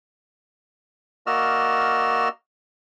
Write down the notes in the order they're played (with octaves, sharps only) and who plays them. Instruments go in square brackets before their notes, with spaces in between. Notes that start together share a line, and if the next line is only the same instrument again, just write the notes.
[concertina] A#3 F#4 D5 D#5 E6 F6